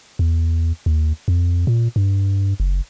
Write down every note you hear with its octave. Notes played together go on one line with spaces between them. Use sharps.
E2
D#2
F2
A#2
G2
F#1